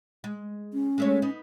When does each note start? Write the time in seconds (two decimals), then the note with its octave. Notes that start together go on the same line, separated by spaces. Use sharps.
0.24 G#3
0.73 C#4
0.98 G#3 A3 C#5
1.22 B3 D#4